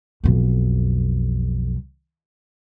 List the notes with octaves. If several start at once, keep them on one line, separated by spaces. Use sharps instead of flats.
B1 F2